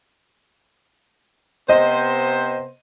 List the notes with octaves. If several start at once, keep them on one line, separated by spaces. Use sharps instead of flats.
C3 B3 C5 D#5